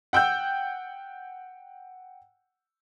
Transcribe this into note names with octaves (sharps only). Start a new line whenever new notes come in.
F#5 G5 E6 G6